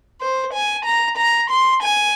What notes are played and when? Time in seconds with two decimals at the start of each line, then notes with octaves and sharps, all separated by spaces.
0.21 C5
0.54 G#5
0.85 A#5
1.18 A#5
1.51 C6
1.83 G#5